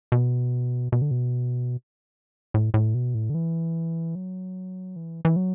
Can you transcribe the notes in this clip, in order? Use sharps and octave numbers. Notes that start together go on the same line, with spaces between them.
B2
B2
D3
B2
A2
A2
B2
A2
D3
E3
F#3
E3
E3
F#3